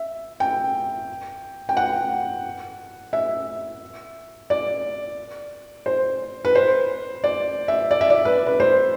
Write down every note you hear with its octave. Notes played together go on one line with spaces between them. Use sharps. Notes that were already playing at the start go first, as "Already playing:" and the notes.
Already playing: E5
G5
G5
F#5
E5
D5
C5
B4
C5
D5
E5
D5
E5
D5
B4
B4
C5